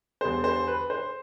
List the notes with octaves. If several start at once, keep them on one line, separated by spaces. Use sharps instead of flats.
E2 D3 G3 D4 C5
C5
B4
C5